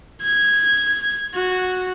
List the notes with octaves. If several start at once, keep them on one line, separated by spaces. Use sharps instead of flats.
G#6
F#4